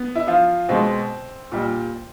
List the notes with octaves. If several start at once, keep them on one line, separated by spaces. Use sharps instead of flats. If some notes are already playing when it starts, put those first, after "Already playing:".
Already playing: B3
E4
F3 F4
B2 G#3 C4
A#2 G3